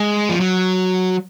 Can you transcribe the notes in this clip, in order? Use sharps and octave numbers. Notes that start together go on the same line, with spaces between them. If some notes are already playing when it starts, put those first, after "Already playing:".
Already playing: G#3
F3
F#3